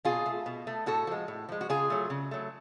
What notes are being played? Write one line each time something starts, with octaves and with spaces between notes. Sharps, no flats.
B2 F4 G#4
A3
B2
A3
A2 F#4 A4
F3 G#3
A2
F3 G#3
F#4
C#3 F4 G#4
F#3 A3
C#3
F#3 A3